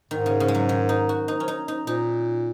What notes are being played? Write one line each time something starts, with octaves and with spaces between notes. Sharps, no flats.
G#2 D#3
C#3
C#3
G#3
F#3
D#3
D#4
F#4
D#4
C#4
D#4
D#4
A#2 D#4